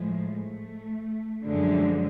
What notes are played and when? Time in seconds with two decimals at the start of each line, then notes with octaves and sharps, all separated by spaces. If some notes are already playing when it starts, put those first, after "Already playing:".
Already playing: A2 F3 G#3
0.15 A3
1.45 F#2 D3 F3 G#3